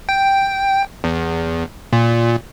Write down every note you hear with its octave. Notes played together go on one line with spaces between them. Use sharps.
G5
E2
A#2